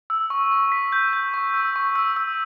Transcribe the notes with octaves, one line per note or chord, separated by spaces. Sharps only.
E6
C#6
C#6
B6
G6
G6
C#6
E6
C#6
E6
E6